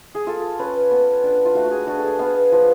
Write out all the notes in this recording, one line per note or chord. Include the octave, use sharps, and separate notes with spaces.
G#4
F4 A4
C#4 B4
B3
D4
F4
A3 F#4
F#4
G#4
D4 F#4
A4
G#4
B3 F5
F3